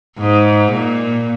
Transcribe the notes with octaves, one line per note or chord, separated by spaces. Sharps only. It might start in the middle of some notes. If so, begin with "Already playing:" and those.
G#2
A#2